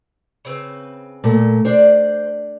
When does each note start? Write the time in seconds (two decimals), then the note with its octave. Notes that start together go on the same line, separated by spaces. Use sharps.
0.45 C#3 C4 B4
1.24 A#2 A3
1.65 D4 C5 D5